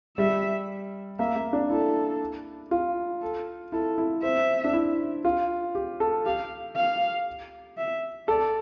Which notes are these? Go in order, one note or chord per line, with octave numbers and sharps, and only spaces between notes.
G3 E5
A#3 E5
A#3
D4
E4 A4
F4
A4
E4 A4
E4
C4 E5
D4
E4
F4
G4
A4
G4 F5
F5
E5
A4 D5